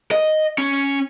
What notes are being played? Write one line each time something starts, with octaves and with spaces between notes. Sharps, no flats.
D#5
C#4